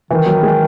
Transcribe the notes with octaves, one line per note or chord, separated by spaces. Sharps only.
D#3 E3
F#3
G#3